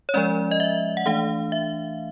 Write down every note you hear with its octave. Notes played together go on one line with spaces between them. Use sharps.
C#5
F3 G#3 C#4 D5
D#5
E5
F#5
E3 A3 D4 F5
E5